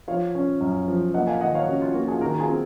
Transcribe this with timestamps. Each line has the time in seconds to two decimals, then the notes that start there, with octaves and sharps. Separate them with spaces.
0.08 F3 C#5 F5
0.35 C#4
0.61 F#2
0.88 F3
1.14 A#3 D#5 F#5
1.27 F5 G#5
1.41 D#3 D#5 F#5
1.55 C#5 F5
1.68 C#4 F#4
1.82 F4
1.94 A#3 F#4
2.08 F4 G#4
2.21 D#3 F#4 A#4
2.39 F4 G#4
2.48 C4